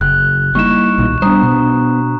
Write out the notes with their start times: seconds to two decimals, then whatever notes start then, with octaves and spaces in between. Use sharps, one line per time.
0.01 F#1 F#6
0.55 G3 A#3 D#4 E4 C#6 E7
0.98 B1 A#2 D#3
1.22 G3 B3 D4 C5 A#5 D#6
1.43 B2 D4